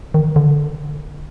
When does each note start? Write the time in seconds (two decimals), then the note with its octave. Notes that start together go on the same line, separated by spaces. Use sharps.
0.14 D#3
0.36 D3